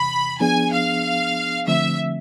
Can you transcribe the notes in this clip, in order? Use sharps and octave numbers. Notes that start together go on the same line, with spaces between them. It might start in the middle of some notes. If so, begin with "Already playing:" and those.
Already playing: E2 C3 E3 B5
F3 B3 D4 G#4 G#5
F5
D3 F3 A3 C4 E5